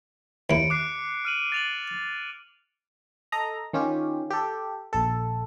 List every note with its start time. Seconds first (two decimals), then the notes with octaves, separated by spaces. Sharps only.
0.50 D#2 E4 C#7 D7
0.70 D6 F#6 C7
1.25 F6 D#7 F#7
1.52 A6 F7 F#7
3.32 A4 D#5 A#5
3.73 D#3 C#4 F4 G4
4.30 G4 A4
4.93 A#1 A4